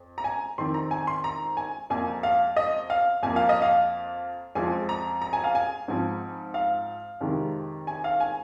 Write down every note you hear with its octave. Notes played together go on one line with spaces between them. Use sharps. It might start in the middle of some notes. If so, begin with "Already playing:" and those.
Already playing: F2
A#5
G#5
F2 D#3 C4 C6
A#5
G#5
C6
A#5
G#5
F2 F3 A#3 G#5
F5
D#5
F5
F2 F3 A#3 G#5
F5
D#5
F5
F2 F3 G#3 C4 G#5
A#5
A#5
G#5
F5
G#5
G#2 F3 C4
F5
F2 C3 D#3 G#3
G#5
F5
G#5